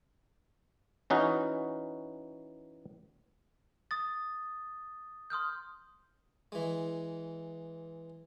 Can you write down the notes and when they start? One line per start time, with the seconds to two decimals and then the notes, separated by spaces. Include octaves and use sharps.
1.10 E3 C#4 D#4 F#4
3.91 D#6 A6
5.30 C6 D#6 F6 G6
6.52 E3 G#3